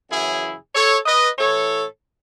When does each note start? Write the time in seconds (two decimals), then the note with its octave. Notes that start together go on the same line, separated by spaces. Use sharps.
0.10 F#2 C#3 E3 E4 G#4
0.74 A4 C#5
1.06 B4 D#5
1.38 A2 E3 A4 C#5